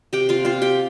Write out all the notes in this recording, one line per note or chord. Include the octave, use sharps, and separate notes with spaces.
C3 G4 G5
F4 F5
C4 F4 F5
G4 G5